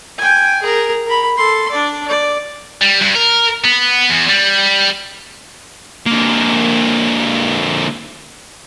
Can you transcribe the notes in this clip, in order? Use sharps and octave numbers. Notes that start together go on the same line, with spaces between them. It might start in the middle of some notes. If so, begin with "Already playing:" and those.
G5 G#5
G#4 A#4
A#4 B5
A4 C6
D4 D5
D5
G3
G2
A#4
B3
E2
G3
D3 A#3